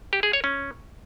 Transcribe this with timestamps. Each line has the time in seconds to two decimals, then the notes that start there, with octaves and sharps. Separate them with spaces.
0.13 G4
0.23 G#4
0.33 C#5
0.44 C#4